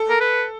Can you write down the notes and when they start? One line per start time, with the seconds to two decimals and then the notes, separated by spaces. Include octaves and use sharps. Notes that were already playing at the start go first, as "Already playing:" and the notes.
Already playing: A4
0.10 A#4
0.20 B4